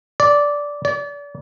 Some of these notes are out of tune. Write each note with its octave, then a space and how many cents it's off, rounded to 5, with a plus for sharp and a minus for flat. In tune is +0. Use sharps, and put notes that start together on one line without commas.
D5 -10
D5 -35